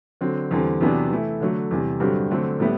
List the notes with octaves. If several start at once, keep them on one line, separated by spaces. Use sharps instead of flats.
D3 F#3 C4
E2 D3 G3 C4
E2 C3 F#3 B3 D4
E3 A3 E4
D3 F#3 A3
E2 C3 G3
G2 D3 F#3 C4 G4
D3 F#3 A3 C4
A2 G3 B3 E4